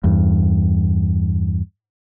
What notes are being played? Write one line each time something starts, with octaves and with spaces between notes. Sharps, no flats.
E2 G2